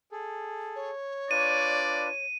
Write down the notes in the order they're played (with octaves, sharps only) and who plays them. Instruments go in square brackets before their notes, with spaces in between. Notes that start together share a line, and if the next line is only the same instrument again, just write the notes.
[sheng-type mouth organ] G#4 A4
[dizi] C#5
[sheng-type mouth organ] D4 F4 B4 [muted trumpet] D5 [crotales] D#7